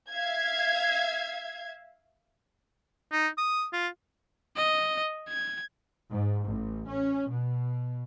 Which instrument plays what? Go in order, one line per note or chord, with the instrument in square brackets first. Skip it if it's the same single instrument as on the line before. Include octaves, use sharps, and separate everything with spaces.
[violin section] E5 F5 G#6
[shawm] D#4
D#6
F4
[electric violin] D#5
G#6
[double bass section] G#2
A1
C#4
B2